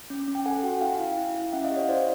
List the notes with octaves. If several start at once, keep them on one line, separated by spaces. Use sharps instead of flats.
C#4
C#4
G5
A4 F#5 G#5
F#4
E4 F5 G5
E4
E4
E4
C#4 E5 F#5
D#5 F5
G4
C#5 D#5
E4 C5 D5